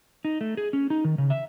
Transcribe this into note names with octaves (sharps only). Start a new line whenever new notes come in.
D#4
A3
G#4
C#4
D#4
D#3
C#3
E5